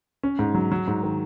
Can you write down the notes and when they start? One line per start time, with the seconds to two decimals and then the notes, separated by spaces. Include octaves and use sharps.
0.23 C#4
0.39 G#2
0.54 F#3
0.72 F#3
0.88 G#2
1.03 D#3